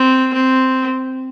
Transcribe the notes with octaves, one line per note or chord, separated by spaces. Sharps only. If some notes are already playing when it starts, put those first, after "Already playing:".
Already playing: C4
C4